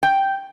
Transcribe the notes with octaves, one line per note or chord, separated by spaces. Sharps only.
G5